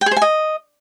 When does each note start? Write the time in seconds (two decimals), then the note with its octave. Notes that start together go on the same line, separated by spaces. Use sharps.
0.01 G5
0.06 G#4
0.11 C5
0.16 G#5
0.22 D#5